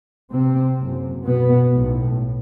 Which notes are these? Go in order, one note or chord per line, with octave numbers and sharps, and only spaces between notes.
C3 C4
F#1 F#2
B2 B3
B1 A2